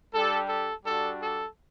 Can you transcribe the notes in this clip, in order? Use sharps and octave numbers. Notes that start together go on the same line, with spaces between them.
G3 D4 G4 A4
A4
G3 D4 F#4 A4
A4